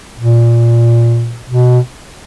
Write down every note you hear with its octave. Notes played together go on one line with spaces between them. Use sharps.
A#2
B2